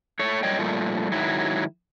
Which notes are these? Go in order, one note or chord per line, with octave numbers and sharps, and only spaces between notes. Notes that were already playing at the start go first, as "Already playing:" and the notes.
A3 C#5
F#2 G3 C#5 D#5 G5
A#2 F3 G3 A3
G#2 D#3 F#3 E4